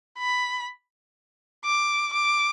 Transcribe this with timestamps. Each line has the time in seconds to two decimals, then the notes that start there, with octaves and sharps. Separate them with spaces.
0.19 B5
1.65 D6
2.13 D6